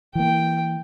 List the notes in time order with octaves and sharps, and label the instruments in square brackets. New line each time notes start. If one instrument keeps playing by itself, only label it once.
[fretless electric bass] E3 A#3 [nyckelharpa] G5